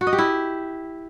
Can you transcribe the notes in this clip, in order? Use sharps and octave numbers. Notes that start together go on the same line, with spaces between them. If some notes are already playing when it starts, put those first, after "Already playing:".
F#4
D#5
G4
E4